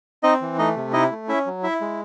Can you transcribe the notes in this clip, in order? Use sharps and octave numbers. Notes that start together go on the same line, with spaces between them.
C4 D#4 D#5
E3
A3 D#4 D#5
C3
D#4 E4 D#5
A3
C#4 E4 E5
F#3
E4 E5
G#3